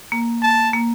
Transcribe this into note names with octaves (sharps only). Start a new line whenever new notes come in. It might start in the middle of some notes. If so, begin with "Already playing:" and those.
A#3
A5
A#3